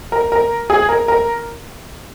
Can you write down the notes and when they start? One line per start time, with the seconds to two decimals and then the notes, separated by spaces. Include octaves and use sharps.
0.12 A#4
0.32 A#4
0.70 G#4
0.89 A#4
1.08 A#4